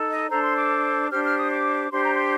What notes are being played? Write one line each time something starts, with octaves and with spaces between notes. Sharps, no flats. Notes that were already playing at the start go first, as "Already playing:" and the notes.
Already playing: D#4 A4
D#5
D4 A4 C5 A#5
C6
D6
D4 G4 C5 F6
F6
D#6
D6
D4 G4 C5 C6
A#5
C6